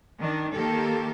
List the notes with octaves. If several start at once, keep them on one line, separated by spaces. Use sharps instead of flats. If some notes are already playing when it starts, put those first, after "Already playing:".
D#3 D4
D#3 A#3 G4 A4